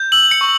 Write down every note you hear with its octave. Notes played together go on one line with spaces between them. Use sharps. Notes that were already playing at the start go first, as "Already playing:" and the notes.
Already playing: G6
E6 F#7
C#7
C#6